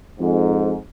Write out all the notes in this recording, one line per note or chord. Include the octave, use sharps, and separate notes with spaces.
F2 G#2